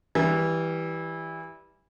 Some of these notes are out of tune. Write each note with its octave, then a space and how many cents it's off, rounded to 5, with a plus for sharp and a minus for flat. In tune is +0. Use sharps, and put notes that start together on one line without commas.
E3 -15 G3 +0